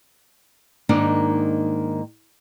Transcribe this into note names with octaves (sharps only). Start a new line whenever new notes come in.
G#2 D#3 A#3 D4 D#4 A#4